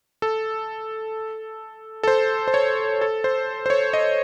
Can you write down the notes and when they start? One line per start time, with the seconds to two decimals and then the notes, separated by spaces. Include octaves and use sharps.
0.22 A4
2.03 A4
2.08 C5
2.48 C5
2.54 C#5
3.01 A4
3.24 C5
3.66 C5
3.70 C#5
3.93 D#5